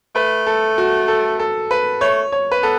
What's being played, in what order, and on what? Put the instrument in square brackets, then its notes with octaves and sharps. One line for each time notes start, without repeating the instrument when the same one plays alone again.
[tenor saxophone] A3 [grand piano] B4
[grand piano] A4
F#4
A4
A4
B4
[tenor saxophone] A3 [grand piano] C#5
[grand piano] C#5
B4
[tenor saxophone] B3 [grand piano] A4